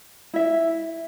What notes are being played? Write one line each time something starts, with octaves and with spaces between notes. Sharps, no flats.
E4 E5